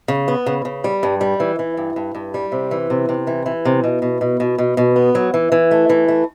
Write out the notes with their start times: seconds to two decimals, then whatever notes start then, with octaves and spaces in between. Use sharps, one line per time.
0.08 C#3
0.28 B3
0.46 C#3
0.65 C#3
0.84 G3
1.03 G2
1.21 G3
1.40 E3
1.59 E3
1.77 G2
1.96 G2
2.15 G2
2.34 G3
2.52 C3
2.71 E3
2.90 C3
3.09 C3
3.27 E3
3.46 E3
3.65 C3
3.84 B2
4.02 B2
4.21 B2
4.40 B2
4.58 B2
4.77 B2
4.96 B3
5.15 F#3
5.34 E3
5.52 E3
5.71 A3
5.90 E3
6.08 A3